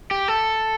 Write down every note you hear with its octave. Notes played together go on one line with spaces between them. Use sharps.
G4
A4